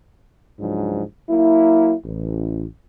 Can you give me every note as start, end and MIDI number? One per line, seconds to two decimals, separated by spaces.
0.59 1.03 37
0.59 1.03 44
0.59 1.03 53
0.59 1.03 54
0.59 1.03 62
1.30 1.94 54
1.30 1.94 58
1.30 1.94 64
2.05 2.65 33